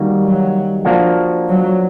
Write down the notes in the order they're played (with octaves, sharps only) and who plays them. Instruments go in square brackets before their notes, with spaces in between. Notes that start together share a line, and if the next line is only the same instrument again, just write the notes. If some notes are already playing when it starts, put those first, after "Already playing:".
Already playing: [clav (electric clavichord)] D#3 G3 A#3 D#4 F#4
[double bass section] F#3
[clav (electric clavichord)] F3 A#3 D4 F#4
[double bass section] F#3